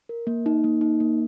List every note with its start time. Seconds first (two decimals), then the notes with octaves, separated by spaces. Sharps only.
0.09 A#4
0.27 A#3
0.46 D#4
0.64 A#3
0.81 D#4
1.00 A#3